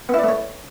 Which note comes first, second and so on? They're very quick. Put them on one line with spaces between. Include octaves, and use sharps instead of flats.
B3 E4 D5 A3 C#5